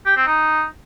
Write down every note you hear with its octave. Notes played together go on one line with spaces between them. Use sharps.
G4
C4
D#4